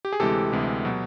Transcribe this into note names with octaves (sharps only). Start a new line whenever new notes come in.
G4
G#4
D2 C3 E3 G#3 G4 A4
D2 C3 E3 G#3
B2 F#3